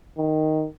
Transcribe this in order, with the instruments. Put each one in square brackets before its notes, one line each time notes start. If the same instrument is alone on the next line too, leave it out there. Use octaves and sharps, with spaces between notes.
[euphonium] D#3